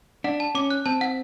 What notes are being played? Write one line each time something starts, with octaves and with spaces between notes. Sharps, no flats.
D4 F#5
A5
C#4 D6
F#6
C4 A5
F#5